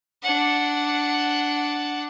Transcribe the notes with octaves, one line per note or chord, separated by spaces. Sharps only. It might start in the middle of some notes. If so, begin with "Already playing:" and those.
D4 F#5